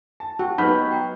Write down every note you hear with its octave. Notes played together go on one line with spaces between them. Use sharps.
A5
F#4 G4 G5
F#3 B3 D#4 B4 B5 F6 G6
F#5 G5 A#5